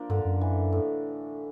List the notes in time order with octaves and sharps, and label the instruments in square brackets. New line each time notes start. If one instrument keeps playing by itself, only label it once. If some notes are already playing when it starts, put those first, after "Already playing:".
Already playing: [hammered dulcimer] F3 A#3 D4
[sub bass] G2 [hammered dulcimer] D3
[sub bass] F#2
[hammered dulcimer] E3
A2